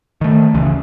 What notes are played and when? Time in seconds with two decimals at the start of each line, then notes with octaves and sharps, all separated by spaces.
0.21 D#3 A3
0.54 D#1 C#2 C#3 E3